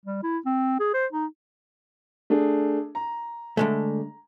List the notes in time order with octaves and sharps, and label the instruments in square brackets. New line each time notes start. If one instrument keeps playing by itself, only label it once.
[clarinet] G3
E4
C4
G#4
C5
D#4
[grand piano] A3 D4 G#4
A#5
[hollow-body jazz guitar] D3 G#3 A3